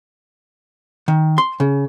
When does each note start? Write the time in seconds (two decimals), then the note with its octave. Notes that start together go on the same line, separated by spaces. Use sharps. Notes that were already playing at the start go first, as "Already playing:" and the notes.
1.08 D#3
1.38 C6
1.60 C#3